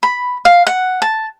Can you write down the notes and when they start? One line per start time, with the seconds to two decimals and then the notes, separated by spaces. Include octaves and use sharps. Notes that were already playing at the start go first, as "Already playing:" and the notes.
0.03 B5
0.45 F5
0.67 F#5
1.02 A5